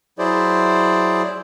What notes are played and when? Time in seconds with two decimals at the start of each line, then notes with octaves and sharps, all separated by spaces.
0.19 F#3 E4 G#4 C5 D5